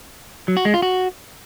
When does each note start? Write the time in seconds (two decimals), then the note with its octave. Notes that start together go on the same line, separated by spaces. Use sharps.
0.48 F#3
0.57 F#4
0.65 G#3
0.74 F4
0.82 F#4